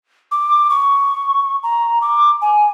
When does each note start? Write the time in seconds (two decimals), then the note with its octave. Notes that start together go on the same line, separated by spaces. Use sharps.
0.31 D6
0.70 C#6
1.63 A#5
2.01 D6
2.42 G#5